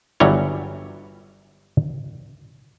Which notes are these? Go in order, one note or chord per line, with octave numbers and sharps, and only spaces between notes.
G1 E3 F#3 G3 C#5